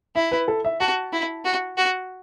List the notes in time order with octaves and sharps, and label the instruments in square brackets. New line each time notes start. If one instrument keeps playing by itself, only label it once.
[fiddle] E4 [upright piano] E5
[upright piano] B4
A4
E5
[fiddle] F#4 [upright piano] A5
[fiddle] E4
F#4
F#4